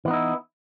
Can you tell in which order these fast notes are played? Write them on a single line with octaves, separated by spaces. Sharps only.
E3 B3 D#4 E4